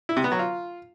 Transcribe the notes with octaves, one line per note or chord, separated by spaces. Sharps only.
E4
C3
B3
F#3
F4